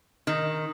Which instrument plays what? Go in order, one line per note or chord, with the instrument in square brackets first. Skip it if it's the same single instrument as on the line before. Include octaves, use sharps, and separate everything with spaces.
[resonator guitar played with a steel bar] D#3